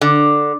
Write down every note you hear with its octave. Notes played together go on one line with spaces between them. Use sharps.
D3